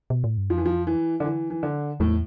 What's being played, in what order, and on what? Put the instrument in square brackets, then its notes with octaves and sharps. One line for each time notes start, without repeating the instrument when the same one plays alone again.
[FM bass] B2
A2
G2
[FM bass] F2 [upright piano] F3
[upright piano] E3
F3
E3
D3
E3
E3
D3
[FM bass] E2 [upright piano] A2